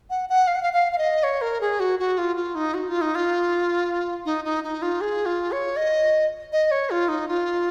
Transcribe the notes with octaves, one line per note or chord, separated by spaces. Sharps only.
F#5
F#5
F5
F#5
F5
F5
F5
D#5
C#5
A#4
G#4
F#4
F#4
F4
F4
D#4
F#4
F4
D#4
F4
D#4
D#4
D#4
F4
G#4
F4
C#5
D#5
D#5
C#5
F4
D#4
F4